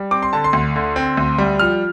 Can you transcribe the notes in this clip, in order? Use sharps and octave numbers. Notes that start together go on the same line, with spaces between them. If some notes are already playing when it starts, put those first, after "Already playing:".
Already playing: G3
C4 D6
C6
D3 A5
C6
D2
D3
C4
D2
G3
F3 F6